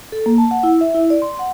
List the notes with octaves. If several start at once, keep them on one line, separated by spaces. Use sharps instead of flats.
A4
A#3
A5
F#5
E4
E5
E4
D5
C6
F#5